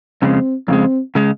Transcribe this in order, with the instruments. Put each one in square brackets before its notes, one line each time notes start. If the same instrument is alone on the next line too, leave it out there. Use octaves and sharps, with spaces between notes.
[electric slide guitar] F2 C#3 G#3 [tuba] C4
[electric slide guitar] F2 C#3 G#3 [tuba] C4
[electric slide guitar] C#3 G#3